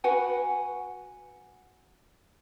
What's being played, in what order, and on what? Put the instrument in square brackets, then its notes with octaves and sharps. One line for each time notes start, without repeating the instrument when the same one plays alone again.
[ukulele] F#4 B4 F#5 G#5